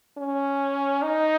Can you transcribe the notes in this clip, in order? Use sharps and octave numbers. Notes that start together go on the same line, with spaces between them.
C#4
D#4